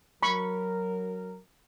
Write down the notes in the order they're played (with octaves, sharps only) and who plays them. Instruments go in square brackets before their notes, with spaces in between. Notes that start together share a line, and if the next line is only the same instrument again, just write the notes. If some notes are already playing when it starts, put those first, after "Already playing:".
[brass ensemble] F#3 A#4 [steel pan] B5 C#6